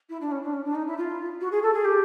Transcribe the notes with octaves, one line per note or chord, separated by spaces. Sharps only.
E4
D4
C#4
D4
C#4
D4
D#4
E4
F4
F#4
G#4
A4
G#4
G4